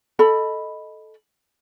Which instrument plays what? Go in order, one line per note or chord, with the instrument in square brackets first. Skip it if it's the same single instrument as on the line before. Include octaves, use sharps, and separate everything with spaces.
[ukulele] A4 D#5 B5